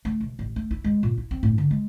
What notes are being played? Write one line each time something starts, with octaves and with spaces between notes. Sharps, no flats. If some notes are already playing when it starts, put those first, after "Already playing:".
A3
E1
A1
A3
E4
G#3
A#2
E4
C4
A2
D3
G#3